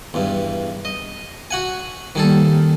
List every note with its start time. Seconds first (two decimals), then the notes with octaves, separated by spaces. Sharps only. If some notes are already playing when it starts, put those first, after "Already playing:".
0.14 E2 G2
0.85 D#5
1.51 F#4 F#5 G#5
2.15 D#3 G3 A#3 G#4 A4